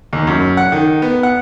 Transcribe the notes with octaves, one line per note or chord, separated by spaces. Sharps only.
D#2
F#2
F#5
D#3
B3
F#5